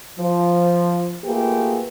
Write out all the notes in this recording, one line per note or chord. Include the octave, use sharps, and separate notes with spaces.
F3
A3 A#3 F4 G4 G#4 B4